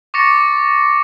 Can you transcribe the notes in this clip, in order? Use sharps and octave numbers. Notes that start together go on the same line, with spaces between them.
C#6 D6 A6 A#6 C#7